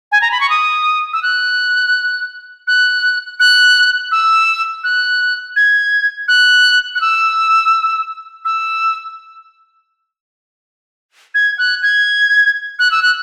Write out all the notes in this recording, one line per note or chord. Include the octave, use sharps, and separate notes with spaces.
G#5
A#5
B5
C#6
D#6
E6
F#6
F#6
F#6
E6
F#6
G#6
F#6
F#6
E6
E6
G#6
F#6
G#6
F#6
E6
F#6